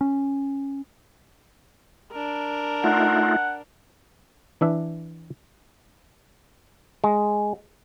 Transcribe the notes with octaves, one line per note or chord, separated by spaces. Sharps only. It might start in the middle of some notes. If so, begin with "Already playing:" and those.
C#4
D4 A#4
A3 D#4 F4 F#5
E3 D4 E5
G#3